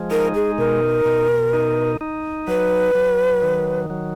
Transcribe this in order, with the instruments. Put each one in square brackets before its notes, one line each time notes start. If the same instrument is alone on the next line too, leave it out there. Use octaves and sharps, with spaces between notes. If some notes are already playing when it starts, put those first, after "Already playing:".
Already playing: [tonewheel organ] F3 G#3
[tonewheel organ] D#4 [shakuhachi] A#4
[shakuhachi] G#4
[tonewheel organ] B2 [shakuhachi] A#4
[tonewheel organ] B2
D#4
D#4
[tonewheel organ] F#3 [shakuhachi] B4
[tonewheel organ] F#3
D#3
F#3